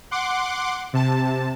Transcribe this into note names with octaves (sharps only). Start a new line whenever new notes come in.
F#5 C6 D6
C3 A5